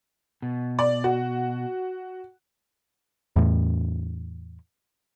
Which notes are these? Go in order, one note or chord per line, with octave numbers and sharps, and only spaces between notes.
B2
D5
F#4
E2 A2